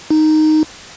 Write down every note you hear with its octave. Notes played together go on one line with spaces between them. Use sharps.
D#4